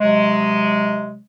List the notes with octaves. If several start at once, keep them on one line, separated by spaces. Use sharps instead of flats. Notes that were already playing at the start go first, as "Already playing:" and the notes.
C3 F#3 G#3